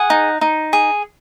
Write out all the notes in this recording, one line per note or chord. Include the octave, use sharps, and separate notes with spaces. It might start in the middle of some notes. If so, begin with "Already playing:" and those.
Already playing: G#4 F#5
D#4
D#4
G#4